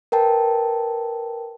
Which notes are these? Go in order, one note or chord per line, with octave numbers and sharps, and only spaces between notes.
A#4 B4 G5 A5